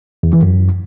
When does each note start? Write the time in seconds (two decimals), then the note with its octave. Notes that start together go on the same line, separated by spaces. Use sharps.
0.23 E2
0.33 E3
0.43 F#2